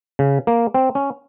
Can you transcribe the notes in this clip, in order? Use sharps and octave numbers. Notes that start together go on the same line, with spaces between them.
C#3
A#3
C4
C#4